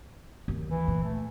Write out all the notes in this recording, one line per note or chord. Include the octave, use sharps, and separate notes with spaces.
D#2
E3
A#2
A3